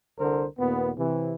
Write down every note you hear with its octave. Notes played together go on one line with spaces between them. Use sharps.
C2 D3 A#4 C5
D#2 A#2 B3
C3 E3